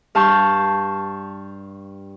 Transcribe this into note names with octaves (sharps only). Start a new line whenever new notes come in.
G2 F5 A5 C#6 G6